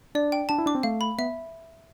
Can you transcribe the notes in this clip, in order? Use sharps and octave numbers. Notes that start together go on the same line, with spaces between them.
D4 D5
G5
D4 A5
E4
D4 D6
C4
A3 F5
B5
B3 E5